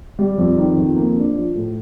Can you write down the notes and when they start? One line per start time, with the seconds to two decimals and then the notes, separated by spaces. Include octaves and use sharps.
0.19 G3
0.38 F2
0.58 D#3
0.77 F2
0.96 A#3
1.16 D4
1.36 F3
1.55 A2